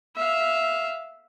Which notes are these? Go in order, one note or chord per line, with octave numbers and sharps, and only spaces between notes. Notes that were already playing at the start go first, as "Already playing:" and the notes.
E5 F5